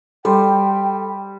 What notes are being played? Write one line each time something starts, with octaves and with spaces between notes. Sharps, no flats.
G3 A4 G5 C6